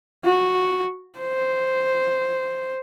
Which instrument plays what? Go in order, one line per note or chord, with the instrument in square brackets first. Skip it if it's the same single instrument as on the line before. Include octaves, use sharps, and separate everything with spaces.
[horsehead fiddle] F#4
C5